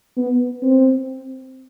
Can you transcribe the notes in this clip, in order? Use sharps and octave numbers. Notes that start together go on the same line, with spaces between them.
B3
C4